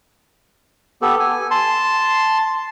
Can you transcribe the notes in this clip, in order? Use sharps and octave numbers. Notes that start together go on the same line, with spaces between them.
B3 G4 A4
G#5
A5 C6